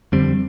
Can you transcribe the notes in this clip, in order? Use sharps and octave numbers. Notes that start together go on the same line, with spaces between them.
F2 D3 G3 C4